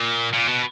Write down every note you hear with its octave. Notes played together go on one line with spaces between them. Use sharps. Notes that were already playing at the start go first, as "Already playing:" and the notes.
Already playing: A#2
A#2
B2